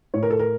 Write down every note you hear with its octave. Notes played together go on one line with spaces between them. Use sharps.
A2 C#5
A#4
A4
A#4